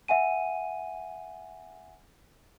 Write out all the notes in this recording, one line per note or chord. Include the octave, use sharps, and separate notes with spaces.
E5 F#5 G#5 D#7